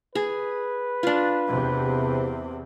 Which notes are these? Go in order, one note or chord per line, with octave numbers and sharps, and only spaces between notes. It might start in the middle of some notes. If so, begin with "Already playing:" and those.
G#4 B4
D4 F4
E2 C3